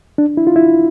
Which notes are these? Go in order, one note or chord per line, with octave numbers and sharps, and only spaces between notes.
D4
E4
F4
E4